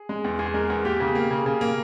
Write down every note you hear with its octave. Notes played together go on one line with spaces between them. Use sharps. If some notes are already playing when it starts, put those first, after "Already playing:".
Already playing: G#4
G#3
E2
E2 G#4
G#3 A#4
E2
A#3 G4
C#3
A#3
C#3
C#3
A#3